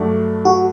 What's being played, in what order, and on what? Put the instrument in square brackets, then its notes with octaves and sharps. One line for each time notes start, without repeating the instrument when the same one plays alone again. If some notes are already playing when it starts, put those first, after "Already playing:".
Already playing: [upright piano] G2 F#3 A3 D4
[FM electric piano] F#4